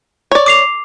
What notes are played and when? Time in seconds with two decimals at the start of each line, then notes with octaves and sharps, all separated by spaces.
0.31 C#5 D5
0.46 D6 C7 F7